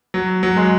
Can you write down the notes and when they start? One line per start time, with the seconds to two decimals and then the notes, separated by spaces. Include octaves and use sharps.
0.14 F#3
0.43 F#3
0.57 G#3